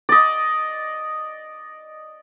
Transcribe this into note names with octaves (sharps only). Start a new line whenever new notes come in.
D5 D#5